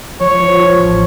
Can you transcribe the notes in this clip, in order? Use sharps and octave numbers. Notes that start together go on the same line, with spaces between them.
F3 C#5
F3
F3
A1